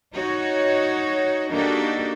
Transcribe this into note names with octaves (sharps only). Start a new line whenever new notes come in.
D#4 F#4 C#5
A#3 D4 D#4 F#4 G4 A4